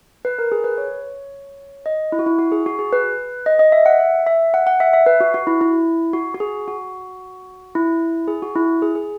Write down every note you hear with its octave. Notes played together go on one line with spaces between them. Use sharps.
B4
A#4
G#4
B4
C#5
D#5
E4
F#4
E4
F#4
G#4
F#4
G#4
B4
D#5
D#5
E5
F#5
E5
E5
F#5
F#5
E5
E5
B4
F#4
F#4
E4
E4
F#4
F#4
G#4
F#4
E4
G#4
F#4
E4
G#4
G#4